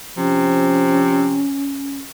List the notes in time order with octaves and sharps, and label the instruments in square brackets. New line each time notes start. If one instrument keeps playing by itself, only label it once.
[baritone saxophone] C3 [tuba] F3 [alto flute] C#4